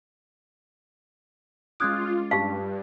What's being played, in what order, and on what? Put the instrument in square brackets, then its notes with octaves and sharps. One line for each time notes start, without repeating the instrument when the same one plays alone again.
[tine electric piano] G#3 C#4 D6 [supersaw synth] F4 [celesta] D#6 F#6 G#6
[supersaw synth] G2 [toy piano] G4 F5 [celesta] A5